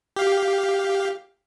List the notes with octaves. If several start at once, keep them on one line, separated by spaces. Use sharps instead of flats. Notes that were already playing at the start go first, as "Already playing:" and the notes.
G4 F5